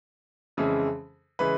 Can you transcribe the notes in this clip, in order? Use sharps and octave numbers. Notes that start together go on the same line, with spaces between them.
F2 C#3 E3 G#3
C#3 E3 G#3 B4